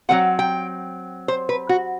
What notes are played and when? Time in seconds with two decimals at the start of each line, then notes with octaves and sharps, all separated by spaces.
0.09 F#3 A3 C4 F#5
0.39 G5
1.28 C5
1.49 B4
1.69 F#4